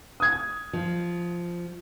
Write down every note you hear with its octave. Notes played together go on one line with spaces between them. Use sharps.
D#6 G#6
F3